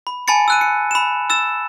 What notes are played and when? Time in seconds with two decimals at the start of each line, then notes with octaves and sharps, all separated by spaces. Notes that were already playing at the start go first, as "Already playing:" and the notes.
0.07 B5
0.28 G#5 A5 B5 A6 C#7
0.48 E6 F#6 D#7
0.61 C#7
0.91 B5 E7
1.30 E6 A6 E7